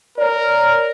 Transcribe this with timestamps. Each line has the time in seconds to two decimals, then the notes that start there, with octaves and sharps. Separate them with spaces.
0.18 A#4 C#5 D5